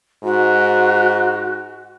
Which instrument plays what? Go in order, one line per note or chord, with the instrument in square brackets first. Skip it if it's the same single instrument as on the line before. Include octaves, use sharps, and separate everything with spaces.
[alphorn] G#2 [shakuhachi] F#4